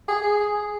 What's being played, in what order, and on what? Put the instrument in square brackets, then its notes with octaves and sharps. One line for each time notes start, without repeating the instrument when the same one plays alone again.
[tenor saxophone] G#4